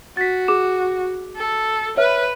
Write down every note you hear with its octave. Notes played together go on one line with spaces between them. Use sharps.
F#4 A6 B6
G#4 D6 E7
A4
B4 C#5 E5 F6